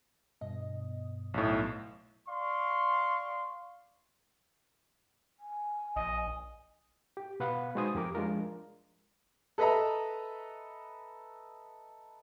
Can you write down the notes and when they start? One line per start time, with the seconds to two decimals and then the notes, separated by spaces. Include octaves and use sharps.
0.41 G2 B2 D#5
1.34 B1 A2
2.29 D5 F5 C6 C#6
5.40 G#5
5.96 A#1 D#5
7.17 G4
7.40 B2 B4 F5 F#5 B5
7.75 G#3 D#4 F#4 C5 G#5 D#6
7.95 F2 G4 A#4 D6
8.15 F3 G#3 D4 F4 A#4
9.58 A4 B4 D#5 E5 A#5